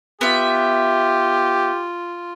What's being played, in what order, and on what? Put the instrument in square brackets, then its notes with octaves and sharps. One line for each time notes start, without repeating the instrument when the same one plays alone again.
[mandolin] B3 E5 [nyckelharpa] F4 [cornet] G4